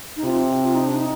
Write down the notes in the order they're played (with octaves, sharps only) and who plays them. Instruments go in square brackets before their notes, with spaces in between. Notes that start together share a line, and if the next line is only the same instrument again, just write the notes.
[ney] D#4
[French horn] C3 [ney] F4
[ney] F4
D#4
D4
D#4